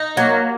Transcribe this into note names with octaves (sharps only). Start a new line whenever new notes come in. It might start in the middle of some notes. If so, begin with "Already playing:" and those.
Already playing: D#4
F#3 A#3